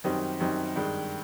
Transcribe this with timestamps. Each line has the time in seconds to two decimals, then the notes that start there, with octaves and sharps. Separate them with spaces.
0.04 F#2 D#3 G3 C4 D#4
0.40 F#2 D#3 G3 C4 D#4
0.76 G2 D#3 G#3